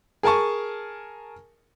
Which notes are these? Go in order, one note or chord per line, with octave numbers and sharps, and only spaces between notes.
G#4 A#4 G#5 A5 C#6